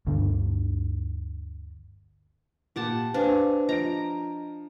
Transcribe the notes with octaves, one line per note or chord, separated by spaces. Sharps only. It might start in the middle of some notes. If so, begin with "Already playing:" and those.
G1 D2 G2 D3
A#2 G4 F#5 A5
D4 B4 C5 F5 G#5
F3 D#5 A#5 D7